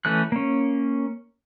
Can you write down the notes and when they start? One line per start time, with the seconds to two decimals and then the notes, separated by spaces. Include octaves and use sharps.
0.05 E3 A3 C#4 F#6
0.32 A#3 C#4